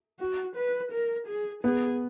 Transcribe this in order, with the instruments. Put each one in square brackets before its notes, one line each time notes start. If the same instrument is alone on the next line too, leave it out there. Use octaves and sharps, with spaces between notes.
[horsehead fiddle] F#4
B4
A#4
G#4
[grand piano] B3 [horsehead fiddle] G#4